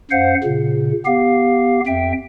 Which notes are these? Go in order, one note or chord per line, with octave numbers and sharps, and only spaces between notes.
F#2 C5 F5 F#5
A#2 C#3
B3 G4 F5
F2 E5 G5